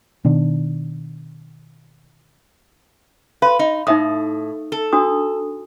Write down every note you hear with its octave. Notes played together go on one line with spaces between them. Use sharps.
B2 D#3 D4
B4 F5 C6
D#4
A2 D#4 E5 D#6
A4
D4 F#4 D#6